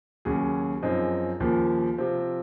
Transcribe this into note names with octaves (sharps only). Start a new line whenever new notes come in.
D#2 C#3 F#3 C#4 G#4
F#2 F3 C4 D#4 G#4
D#2 C#3 F3 A#3
C3 F3 C4